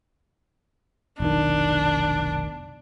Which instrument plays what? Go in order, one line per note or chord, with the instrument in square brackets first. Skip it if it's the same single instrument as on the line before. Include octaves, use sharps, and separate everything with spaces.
[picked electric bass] F1 B1 D#3 [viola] D4